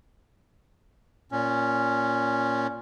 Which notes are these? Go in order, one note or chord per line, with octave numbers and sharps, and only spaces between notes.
A#2 C#4